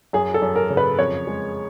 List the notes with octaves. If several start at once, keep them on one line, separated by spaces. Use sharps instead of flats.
F#2 G#4
A4
F#2
A#4
C#3
B4
F2 C#5
G#3